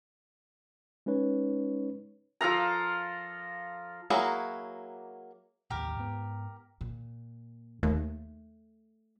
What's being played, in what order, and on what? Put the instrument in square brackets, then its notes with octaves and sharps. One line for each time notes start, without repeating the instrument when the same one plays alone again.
[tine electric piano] G#3 C#4 D#4 B4 C#5
[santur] F3 A4 F5 A#5
[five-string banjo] F#3 A#3 E4 F#4 G#4
[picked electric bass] A1 D#2 [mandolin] G4 A#4
[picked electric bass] G#2 B3
[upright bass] A#2
[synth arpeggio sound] D#2 [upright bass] A3